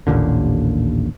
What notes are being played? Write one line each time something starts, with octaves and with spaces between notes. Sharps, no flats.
A1 D#2 A#2 D3